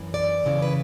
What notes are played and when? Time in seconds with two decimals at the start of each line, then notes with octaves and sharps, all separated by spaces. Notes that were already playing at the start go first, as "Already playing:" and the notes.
Already playing: F#2 E3
0.14 D5
0.44 E2 C#3 E3
0.62 B4